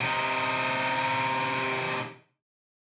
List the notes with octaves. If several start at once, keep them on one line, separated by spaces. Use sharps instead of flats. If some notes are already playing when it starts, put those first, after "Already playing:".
C3 D#4